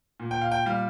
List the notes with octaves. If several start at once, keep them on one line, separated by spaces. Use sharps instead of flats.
A#2
G5
F5
G5
G3 F5